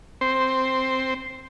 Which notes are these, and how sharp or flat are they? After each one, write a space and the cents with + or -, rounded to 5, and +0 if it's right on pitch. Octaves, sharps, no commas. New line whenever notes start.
C4 +0 C5 +0